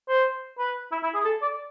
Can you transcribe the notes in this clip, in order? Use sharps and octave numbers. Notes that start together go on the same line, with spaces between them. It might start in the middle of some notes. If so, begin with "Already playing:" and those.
C5
B4
E4
E4
G#4
A4
D5